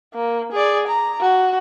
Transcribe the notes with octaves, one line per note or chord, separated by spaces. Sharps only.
A#3
G#4 D5
A#5
F#4